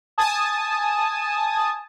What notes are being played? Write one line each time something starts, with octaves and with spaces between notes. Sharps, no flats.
G#5 A5 D#6